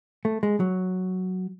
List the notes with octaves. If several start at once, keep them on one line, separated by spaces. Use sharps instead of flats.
A3
G#3
F#3